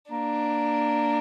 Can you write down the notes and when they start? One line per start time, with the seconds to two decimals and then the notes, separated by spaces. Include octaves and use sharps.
0.11 A#3 D4